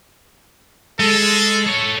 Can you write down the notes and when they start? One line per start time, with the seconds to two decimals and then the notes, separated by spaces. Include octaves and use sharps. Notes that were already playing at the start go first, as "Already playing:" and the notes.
1.00 G#3 A4
1.66 A4 C#5